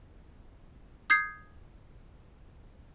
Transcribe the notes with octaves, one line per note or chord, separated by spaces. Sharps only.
D#6 G6 G#6 C7